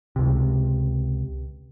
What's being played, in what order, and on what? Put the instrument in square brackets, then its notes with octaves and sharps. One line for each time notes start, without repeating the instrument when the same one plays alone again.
[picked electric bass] C#2 C3